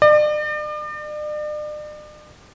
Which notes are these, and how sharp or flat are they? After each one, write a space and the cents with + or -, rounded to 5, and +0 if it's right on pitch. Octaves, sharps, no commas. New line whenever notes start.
D5 +40